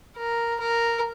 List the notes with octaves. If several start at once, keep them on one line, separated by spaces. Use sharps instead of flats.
A#4
A#4